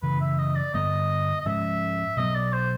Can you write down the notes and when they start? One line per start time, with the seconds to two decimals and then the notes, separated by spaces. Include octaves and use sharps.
0.02 F#2 C#3 E3 B4
0.21 E5
0.38 D#5
0.56 D5
0.74 G2 D3 G3 B3 D#5
1.41 D#5
1.46 G#2 F3 G#3 C#4 E5
2.17 B2 F#3 B3 D#5
2.35 D5
2.53 C5